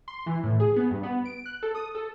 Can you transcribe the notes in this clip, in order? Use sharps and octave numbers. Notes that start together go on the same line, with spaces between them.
C6
E3
A2
G#4
B3
G2
B3
D7
F#6
A4
D#6
A4